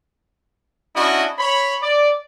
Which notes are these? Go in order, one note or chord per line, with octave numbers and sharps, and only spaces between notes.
C#4 D4 E4 F#4 D#5
C#5 B5
D5